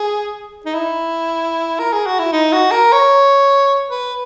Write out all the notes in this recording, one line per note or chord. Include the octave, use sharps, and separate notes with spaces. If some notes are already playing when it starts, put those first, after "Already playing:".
Already playing: G#4
D#4
E4
A#4
G#4
F#4
E4
D#4
F#4
A#4
C#5
B4